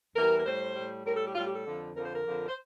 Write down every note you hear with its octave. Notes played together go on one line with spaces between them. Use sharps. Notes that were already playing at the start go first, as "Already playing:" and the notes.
E2 E3 G3 A#4
A#4
A2 G3 C5
A2 G3
A2 G3 A#4
A4
G4
A2 G3 F4
G4
A4
F2 D3 F3
F2 D3 F3 A#4
C5
A#4
F2 D3 F3
C5